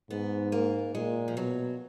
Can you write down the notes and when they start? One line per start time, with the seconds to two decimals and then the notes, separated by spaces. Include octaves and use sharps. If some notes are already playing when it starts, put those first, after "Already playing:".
0.10 G#2 B3
0.52 A#3
0.95 A#2 G#3
1.28 F3
1.36 B2 F#3